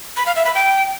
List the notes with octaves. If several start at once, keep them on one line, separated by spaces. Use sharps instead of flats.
B5
F5
E5
B5
G5